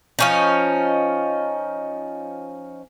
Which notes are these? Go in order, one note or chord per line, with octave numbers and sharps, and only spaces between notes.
F3 C#4 D#4